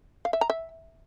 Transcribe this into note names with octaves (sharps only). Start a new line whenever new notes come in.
F5
E5
A#5
E5